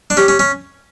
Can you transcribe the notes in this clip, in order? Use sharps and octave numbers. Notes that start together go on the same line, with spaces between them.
D4
C#4 G4
C#4
C#4